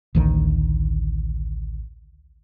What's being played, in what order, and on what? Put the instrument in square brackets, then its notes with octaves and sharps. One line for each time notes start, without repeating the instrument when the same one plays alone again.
[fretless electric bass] A1 D2 D#3